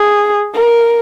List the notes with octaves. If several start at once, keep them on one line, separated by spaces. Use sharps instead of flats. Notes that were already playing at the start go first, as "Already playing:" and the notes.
Already playing: G#4
A#4